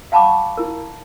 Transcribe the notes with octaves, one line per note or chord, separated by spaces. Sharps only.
F5 F#5 A5 B5 C#6 D6
E4 A#4